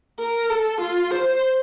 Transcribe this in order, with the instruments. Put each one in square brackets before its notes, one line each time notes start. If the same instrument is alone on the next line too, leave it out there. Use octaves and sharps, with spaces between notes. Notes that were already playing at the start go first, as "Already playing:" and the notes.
[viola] A#4
A4
F4
C5